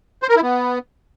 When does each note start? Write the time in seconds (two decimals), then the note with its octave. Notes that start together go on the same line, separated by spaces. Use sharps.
0.22 C5
0.29 A#4
0.36 E4
0.43 B3